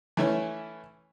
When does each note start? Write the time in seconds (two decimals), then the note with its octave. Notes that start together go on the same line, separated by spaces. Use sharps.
0.17 E3 A3 C#4